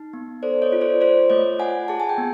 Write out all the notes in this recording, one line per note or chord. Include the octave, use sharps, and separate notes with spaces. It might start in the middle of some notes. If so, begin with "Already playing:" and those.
Already playing: D#4
B3
A4 C5 D5
C#5 D#5
F4
C5 D5
F4 C5 D5
A3 C#5 D#5
F4 F#5 G#5
G#4 A5
G#5
G5
B3